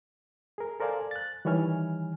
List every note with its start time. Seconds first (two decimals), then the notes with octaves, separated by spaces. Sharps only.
0.58 G#4 A#4
0.80 A4 A#4 C5 D5 F5 G#5
1.11 F#6 A6
1.45 D#3 E3 G3 C#5 G#5 F6